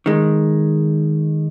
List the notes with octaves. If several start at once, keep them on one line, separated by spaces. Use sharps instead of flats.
D#3 G#3